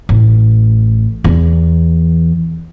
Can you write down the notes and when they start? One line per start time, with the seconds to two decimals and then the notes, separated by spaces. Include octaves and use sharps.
0.09 A1
1.24 E2